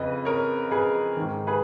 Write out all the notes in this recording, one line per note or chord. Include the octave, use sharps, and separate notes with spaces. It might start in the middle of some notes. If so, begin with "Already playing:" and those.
Already playing: F2 C#3 B4 D#5
A#4 C#5
G#4 B4
G#2 D#3
G#4 B4